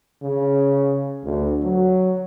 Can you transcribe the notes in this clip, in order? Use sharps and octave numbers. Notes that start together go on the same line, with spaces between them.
C#3
D2
F#3